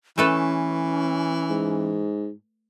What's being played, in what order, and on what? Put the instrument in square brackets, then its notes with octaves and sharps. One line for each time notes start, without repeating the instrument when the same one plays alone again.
[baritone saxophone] E3 [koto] A3 A4 B4 [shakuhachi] C#4
[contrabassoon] G#2